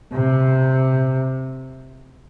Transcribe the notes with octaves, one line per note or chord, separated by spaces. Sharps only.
C3